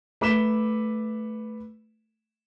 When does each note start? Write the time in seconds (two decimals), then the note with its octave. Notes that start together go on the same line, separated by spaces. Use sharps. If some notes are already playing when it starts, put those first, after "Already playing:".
0.21 A3 B4 D6 B6 E7 G7